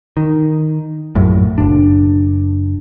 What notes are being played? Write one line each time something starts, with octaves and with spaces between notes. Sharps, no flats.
D#3
A#1 F#2 A2
F#1 D4